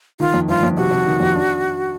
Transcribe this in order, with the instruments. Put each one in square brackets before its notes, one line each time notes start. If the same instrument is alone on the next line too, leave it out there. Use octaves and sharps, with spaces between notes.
[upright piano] D#3 [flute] F4
[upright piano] F2
[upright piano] G1 [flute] F4
[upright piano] F2
[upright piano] C3 [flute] F#4
[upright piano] C3
D#3
F2
D4